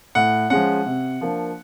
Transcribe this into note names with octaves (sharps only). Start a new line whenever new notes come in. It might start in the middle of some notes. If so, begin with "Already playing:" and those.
A2 F#5
F3 G#3 C#4 F#5
C3
F3 A#3 D4